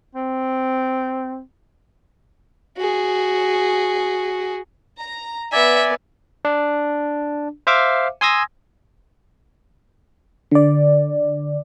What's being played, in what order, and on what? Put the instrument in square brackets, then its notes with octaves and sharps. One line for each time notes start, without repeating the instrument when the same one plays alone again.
[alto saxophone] C4
[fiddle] F#4 G#4
[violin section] A#5
[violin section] B3 [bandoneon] D5 G#5 [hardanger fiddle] E5
[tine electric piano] D4
C5 E5 F5 D6
G#5 C6 D#6 E6 G#6 A#6
[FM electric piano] D3 D5